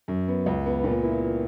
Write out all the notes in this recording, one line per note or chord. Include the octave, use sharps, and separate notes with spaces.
F#2
B3
C#2
B3
A#2
E4